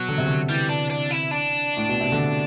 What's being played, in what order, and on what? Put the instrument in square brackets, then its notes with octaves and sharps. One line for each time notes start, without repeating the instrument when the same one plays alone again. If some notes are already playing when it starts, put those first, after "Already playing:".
Already playing: [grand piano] B2 [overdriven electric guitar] F#3
[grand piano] D3
C3
D3
[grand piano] E3 [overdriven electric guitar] G3
[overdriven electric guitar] D4
D4
E4
D4
[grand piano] A2
B2
C3
D3